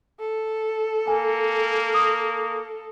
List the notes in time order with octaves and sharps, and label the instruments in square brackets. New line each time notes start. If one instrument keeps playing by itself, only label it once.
[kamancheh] A4
[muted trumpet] A#3 [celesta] G#5
[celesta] D#6